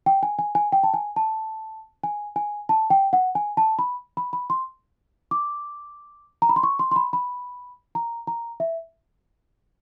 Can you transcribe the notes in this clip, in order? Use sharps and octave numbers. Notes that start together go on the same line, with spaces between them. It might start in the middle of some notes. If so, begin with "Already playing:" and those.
G5
G#5
G#5
G#5
G5
A5
G#5
A5
G#5
G#5
A5
G5
F#5
G#5
A5
B5
B5
B5
C6
D6
A#5
B5
C6
C#6
C6
C6
B5
B5
A#5
A#5
E5